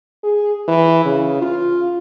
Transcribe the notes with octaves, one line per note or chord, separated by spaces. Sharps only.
G#4
E3
C#3
F4